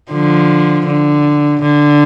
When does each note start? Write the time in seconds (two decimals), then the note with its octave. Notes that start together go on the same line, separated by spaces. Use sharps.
0.12 D3 F3
0.87 D3
1.62 D3